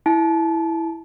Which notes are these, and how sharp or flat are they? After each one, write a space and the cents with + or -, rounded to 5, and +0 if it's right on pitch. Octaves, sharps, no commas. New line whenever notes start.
E4 +0 A5 -35